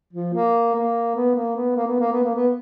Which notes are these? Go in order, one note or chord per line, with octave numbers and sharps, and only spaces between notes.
F3
A#3
A#3
B3
A#3
B3
A#3
B3
A#3
B3
A#3
B3